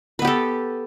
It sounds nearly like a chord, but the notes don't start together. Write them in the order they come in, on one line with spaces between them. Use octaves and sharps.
B4 B3 G4 A4